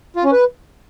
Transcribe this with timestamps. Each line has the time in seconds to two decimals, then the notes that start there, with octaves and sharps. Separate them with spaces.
0.16 F4
0.24 C#4
0.32 B4